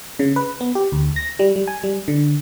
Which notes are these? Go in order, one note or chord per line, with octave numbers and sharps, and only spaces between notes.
C#3
B4
B3
G4
D2
A#6
G3
G3
G#5
G3
D3